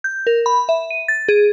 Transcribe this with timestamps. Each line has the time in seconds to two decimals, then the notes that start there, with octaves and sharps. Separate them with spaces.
0.04 G6
0.27 A#4
0.46 B5
0.69 E5
0.91 D#7
1.08 A6
1.28 G#4